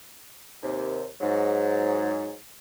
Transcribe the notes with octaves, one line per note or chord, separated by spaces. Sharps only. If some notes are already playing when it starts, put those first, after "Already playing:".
D#2 C3
G#2 F#3